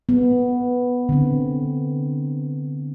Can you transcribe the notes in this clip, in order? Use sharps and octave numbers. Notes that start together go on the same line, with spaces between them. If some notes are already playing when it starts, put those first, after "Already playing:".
B3
D3 C4